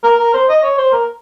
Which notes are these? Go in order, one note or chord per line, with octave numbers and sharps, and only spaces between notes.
A#4
A#4
C5
D#5
C#5
C5
A#4